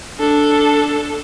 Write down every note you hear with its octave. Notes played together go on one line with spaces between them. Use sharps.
D4 A4